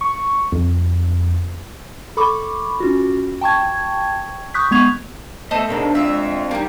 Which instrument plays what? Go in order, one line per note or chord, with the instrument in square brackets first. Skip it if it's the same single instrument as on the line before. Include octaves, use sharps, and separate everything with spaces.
[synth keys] C#6
F2
[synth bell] A4 B5 C#6 D6
C#4 F4 F#4
G5 A5 C#6 G#6
C#6 D#6 F#6 G6 B6
G#3 B3 C#6 G#6 F7
[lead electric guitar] A3 [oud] B3 [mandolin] A4 C5 D#5
[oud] B2 D4 D#4 [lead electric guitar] G#3 A#3
[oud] G#3 D5 [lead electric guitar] C4 F4 [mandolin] E5
[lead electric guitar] G3 [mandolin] A#3 D#4